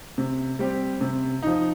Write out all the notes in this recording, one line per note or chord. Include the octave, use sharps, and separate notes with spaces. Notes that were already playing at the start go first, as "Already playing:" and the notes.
C3
G3 C4 G4
C3
F3 D#4